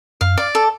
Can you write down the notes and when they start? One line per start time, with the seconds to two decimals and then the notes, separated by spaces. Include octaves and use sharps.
0.21 F#2 F5
0.38 D5
0.55 A4